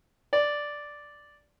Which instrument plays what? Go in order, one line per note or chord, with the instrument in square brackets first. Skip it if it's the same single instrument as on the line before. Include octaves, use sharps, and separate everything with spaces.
[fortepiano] D5